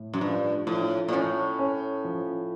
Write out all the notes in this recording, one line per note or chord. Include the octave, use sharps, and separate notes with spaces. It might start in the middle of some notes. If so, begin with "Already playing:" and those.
Already playing: A2
F#2
G2 F3
A2 F3
A#2
A2 C#4
C#4
F3